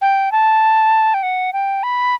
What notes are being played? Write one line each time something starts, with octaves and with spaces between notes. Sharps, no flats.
G5
A5
G5
F#5
G5
B5